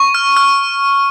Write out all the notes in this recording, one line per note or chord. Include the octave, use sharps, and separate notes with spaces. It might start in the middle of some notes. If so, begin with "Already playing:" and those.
Already playing: C#6
F6
F6